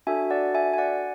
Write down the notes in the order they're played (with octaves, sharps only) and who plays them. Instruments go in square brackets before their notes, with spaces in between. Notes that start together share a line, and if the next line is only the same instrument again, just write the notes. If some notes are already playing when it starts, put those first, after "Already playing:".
[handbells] D4 F#4 A4 E5 G#5
D5 F#5
E5 G#5
G#5
D5 F#5